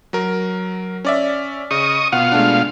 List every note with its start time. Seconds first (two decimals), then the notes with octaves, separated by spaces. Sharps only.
0.13 F#3 A#4
1.05 C#4 D5 E5
1.71 C#3 D#5 C#6 D#6
2.12 B2 F4 F5 F#5
2.32 G#3 A3 D4